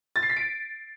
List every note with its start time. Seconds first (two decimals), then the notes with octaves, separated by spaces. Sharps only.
0.16 A6
0.23 C7
0.30 B6
0.37 D7